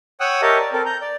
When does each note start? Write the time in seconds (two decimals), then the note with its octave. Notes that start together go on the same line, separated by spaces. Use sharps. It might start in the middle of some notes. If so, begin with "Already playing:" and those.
0.20 C#5 F#5 G5 D#6 E6 F#6
0.42 G4 A#4 C#5 D#5 E5 A5
0.59 D5
0.73 C4 A4 A#4
0.86 A#5 G6
1.02 D5